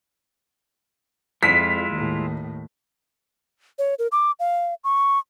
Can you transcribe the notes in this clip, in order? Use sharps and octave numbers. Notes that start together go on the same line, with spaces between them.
F2 G#3 E4 F4 B6
D#2 A2
C#5
A#4
D6
F5
C#6